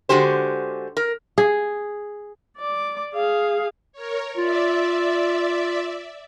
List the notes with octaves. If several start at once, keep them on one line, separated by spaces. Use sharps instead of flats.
D3 G#3 F#4 G4 C5
A#4
G#4
D5 D6
G#4 F5
A#4 C#5
F4 D5 E5